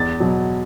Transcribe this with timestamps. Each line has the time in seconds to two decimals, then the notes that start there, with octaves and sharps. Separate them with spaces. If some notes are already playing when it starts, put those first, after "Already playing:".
Already playing: E2 A6
0.20 B2 F#3